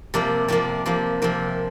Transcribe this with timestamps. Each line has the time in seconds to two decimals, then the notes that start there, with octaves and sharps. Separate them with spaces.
0.14 C3 F3 A#3 D5
0.48 C3 F3 A#3 D5
0.86 C3 F3 A#3
1.22 C3 F3 A#3